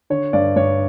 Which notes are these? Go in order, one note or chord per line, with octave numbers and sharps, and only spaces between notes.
D3 C#5
G2 D5
G2 C#5